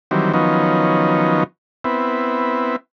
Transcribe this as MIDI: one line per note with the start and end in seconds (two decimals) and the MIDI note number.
0.11 0.33 51
0.11 0.33 52
0.11 0.33 54
0.11 0.33 55
0.11 0.33 60
0.34 1.44 51
0.34 1.44 53
0.34 1.44 54
0.34 1.44 59
0.34 1.44 61
0.34 1.44 63
1.84 2.76 59
1.84 2.76 60
1.84 2.76 64